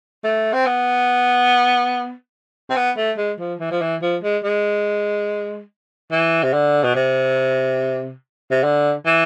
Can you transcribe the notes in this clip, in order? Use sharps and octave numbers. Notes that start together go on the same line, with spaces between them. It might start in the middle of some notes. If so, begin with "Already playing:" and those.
A3
C4
B3
C4
B3
A3
G#3
F3
E3
F3
E3
F3
G#3
G#3
E3
C3
D3
B2
C3
C3
D3
E3